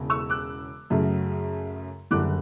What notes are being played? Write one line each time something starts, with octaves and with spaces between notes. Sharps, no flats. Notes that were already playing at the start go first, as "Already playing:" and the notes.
Already playing: E1 E2 C#3
C#6 E6
D6 F#6
F#2 C#3 F#3 A3
F#1 F#2 D3 G3 D6 F#6